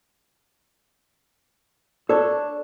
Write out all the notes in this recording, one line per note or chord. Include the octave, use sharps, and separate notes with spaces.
D4 A4 C#5